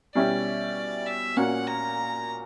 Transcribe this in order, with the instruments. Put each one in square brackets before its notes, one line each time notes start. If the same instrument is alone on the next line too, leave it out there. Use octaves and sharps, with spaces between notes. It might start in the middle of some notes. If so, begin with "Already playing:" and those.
[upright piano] B2 G3 C#4 E4 G4 [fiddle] D5
[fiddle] E5
[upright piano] A#2 A#3 C#4 F#4 [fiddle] F#5
[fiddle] A#5